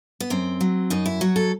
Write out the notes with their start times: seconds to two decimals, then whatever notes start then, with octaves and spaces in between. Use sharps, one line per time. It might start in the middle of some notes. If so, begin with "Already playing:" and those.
0.20 B3
0.30 F#2 C4
0.61 F#3
0.90 F#2 D#4
1.06 E4
1.21 F#3 F#4
1.36 A4